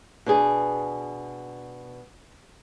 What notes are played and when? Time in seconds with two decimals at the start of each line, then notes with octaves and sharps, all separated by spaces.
0.26 B2 D4 G#4